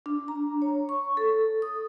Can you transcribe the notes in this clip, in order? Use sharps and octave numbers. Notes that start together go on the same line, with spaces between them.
D4
A#5
C#5
C#6
A4
D#6